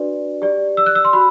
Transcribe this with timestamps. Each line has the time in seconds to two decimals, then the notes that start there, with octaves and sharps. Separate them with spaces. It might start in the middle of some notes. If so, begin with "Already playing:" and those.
Already playing: D4 F#4 B4 D5
0.42 G4 D5
0.77 E6
0.86 F#6
0.95 E6
1.05 C6
1.13 F#4 B5